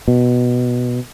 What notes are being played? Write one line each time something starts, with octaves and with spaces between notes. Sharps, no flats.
B2